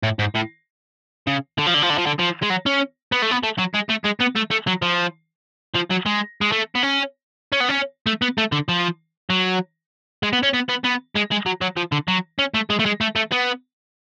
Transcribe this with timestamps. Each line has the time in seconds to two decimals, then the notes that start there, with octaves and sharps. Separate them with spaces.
0.03 A2
0.19 G#2
0.35 A2
1.27 C#3
1.58 D3
1.66 F3
1.74 D3
1.82 F3
1.90 D3
1.98 F3
2.07 D3
2.19 F3
2.43 G#3
2.50 F#3
2.66 C#4
3.12 B3
3.22 A3
3.31 B3
3.44 A3
3.59 F#3
3.74 G#3
3.90 A3
4.05 G#3
4.21 B3
4.36 A3
4.51 A3
4.67 F#3
4.82 F3
5.74 F3
5.90 F#3
6.06 G#3
6.41 G#3
6.52 A3
6.75 B3
6.83 C#4
7.53 C#4
7.61 B3
7.69 C#4
8.06 A3
8.22 B3
8.38 A3
8.52 D3
8.69 F3
9.30 F#3
10.23 G#3
10.33 B3
10.43 C#4
10.54 B3
10.69 B3
10.84 B3
11.15 G#3
11.31 G#3
11.46 F#3
11.62 F#3
11.77 F3
11.92 D3
12.08 F#3
12.39 C#4
12.54 A3
12.70 G#3
12.79 A3
12.86 G#3
13.01 A3
13.16 A3
13.32 B3